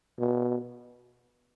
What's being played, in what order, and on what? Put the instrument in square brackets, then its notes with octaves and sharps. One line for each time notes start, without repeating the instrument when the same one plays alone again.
[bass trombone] B2